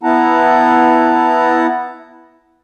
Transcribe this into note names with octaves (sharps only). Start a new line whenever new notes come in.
B3 E4 F#5 A5 A#5